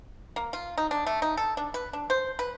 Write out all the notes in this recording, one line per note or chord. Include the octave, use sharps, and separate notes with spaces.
A#3
F4
D#4
D4
A3
D#4
A4
D4
B4
D4
C5
B4